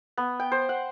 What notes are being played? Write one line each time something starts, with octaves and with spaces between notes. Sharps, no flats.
B3
G5
C5
F#5